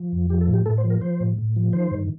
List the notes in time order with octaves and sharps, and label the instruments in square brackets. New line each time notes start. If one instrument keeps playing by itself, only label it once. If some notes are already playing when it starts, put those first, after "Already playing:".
Already playing: [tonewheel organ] F3
F2
F3 G4
A4
A2
G4
A2 A4
C5
F3
A#4
F3 C5
A2
A2
F3
D#3 C5
G2